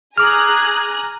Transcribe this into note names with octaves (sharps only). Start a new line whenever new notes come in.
G#4 G#5 A#5 D6 F6 F#6